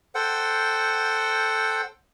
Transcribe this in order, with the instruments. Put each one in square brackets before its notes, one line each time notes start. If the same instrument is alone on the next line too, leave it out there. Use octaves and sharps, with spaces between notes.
[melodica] A4 C5 F#5 G5